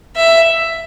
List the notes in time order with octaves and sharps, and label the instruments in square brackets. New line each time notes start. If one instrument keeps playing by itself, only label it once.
[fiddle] E5